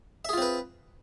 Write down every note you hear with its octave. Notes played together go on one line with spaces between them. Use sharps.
C4 F4 G#4 B4 E5